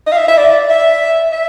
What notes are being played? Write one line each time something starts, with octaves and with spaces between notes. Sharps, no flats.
D#5
F5
E5
E5
D5
E5
E5